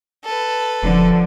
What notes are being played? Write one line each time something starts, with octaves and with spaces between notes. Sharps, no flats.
A4 B4
E1 D3 F3